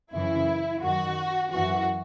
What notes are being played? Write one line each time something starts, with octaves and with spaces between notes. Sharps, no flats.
F#2 C#3 E3 E4
F#2 D#3 F#4
F#2 E3 F#4